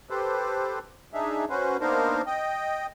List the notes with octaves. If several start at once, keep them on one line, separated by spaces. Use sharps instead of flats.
G4 A4 B4 C5
D4 D#4 G#4 E5
C#4 F#4 B4 C5
A#3 B3 D4 D#4 A#4 C5
D#5 G5